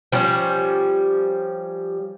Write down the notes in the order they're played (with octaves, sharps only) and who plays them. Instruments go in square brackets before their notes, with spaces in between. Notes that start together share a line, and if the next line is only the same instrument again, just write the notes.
[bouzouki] F3 G3 C#4